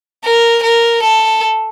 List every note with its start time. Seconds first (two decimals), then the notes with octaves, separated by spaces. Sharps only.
0.25 A#4
0.63 A#4
1.02 A4